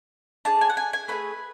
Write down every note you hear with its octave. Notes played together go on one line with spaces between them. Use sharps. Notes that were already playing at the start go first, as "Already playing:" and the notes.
D4 G#4 A5
G#5
F#5
G#5
G#5
A3 E4 G#4 B4